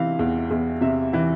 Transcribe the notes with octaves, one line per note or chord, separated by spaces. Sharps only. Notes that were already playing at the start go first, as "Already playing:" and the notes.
Already playing: C3 E3 F5
E2
E2
C3 E5
E3